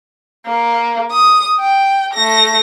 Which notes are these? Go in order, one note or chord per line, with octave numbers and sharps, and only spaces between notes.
A#3
D#6
G5
A3 A#6